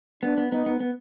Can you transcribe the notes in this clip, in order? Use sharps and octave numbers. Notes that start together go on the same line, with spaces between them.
B3 D4
B3
B3 D#4
B3
B3